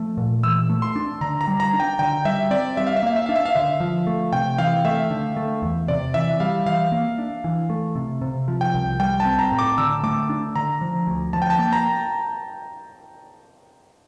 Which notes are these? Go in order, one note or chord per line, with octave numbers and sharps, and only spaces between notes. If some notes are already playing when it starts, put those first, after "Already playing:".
Already playing: F3 A3
A#2
E3 E6
A3
C6
D4
D3 A#5
A#5
G3
A#5
D4
G5
D3 G5
G3 E5
C4 D5
G3 E5
F5
E5
A#3 F5
E5
D4 F5
E5
F5
D3 E5
F3
A3
C3 G5
E3 F5
A3 E5
D3
A3
E2
C3 D5
E3 E5
G3 F5
E3 F5
A#3
D4
E3
A3
C3
C3
F3
G5
C2
G3 G5
A5
C4
A#5
A2
D6
D3 E6
A3 D6
D4
D3 A#5
F3
D2
F3 A5
G5
A5
A#3
A#5